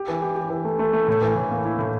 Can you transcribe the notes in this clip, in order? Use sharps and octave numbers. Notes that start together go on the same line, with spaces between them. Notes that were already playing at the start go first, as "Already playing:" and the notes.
Already playing: G4
E3
G4
G4
E3
A3
A3
A3
A2
E3
A2
A#3
E4
A2